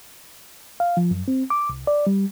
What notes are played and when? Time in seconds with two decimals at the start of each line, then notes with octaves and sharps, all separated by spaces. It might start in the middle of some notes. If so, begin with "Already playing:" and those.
0.80 F5
0.97 F3
1.11 F#2
1.28 C4
1.50 D6
1.69 C2
1.87 D5
2.07 G3